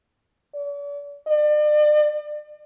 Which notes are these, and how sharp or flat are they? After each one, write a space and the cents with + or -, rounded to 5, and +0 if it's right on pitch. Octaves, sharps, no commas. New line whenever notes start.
D5 -45
D5 +40